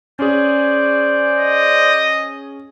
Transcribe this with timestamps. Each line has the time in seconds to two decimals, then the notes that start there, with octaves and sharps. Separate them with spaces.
0.19 C#4 G#4 C5 D5
1.37 D#5